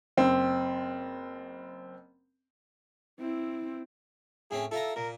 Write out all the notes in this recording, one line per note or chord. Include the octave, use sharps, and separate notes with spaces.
F#1 C4
C4 E4
A2 C4 C#4 G#4
E4 F4 A4 A#5
A#2 A#4